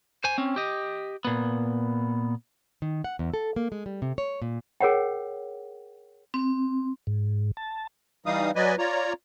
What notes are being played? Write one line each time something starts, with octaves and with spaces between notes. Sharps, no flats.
C5 G#5
C4 C#4
G4 D#5
A#2 B3
D#3
F#5
E2
A4
A#3
G#3
G3
C3
C#5
A#2
G#4 A#4 C#5 F#5 G5
C4
G#2
A5
E3 G3 D#4 F5 D#6
F#3 B4 D5 D#5 G#5
F4 C#5 D5 A#5